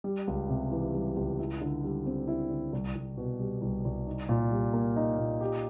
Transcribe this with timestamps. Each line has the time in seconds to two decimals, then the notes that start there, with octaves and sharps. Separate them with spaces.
0.04 G3
0.28 C#2
0.49 C3
0.72 E3
0.94 G3
1.16 C#2
1.39 E4
1.61 D3
1.83 G3
2.06 C4
2.28 E4
2.50 D3
2.73 C2
2.95 C2
3.17 B2
3.39 G3
3.62 C2
3.85 C2
4.07 D#4
4.29 A#2
4.51 G3
4.73 A#3
4.96 D#4
5.18 A#2
5.41 G4